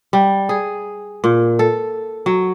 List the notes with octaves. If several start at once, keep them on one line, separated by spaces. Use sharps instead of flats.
G3
G#4
A#2
A4
F#3